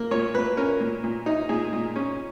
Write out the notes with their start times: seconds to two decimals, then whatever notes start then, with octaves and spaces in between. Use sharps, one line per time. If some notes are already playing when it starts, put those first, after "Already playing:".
Already playing: A#3
0.11 A#2 C#5
0.34 A#2 B4
0.57 C#4 A#4
0.80 A#2
1.04 A#2
1.26 D#4
1.49 A#2 G#4
1.73 A#2
1.96 C#4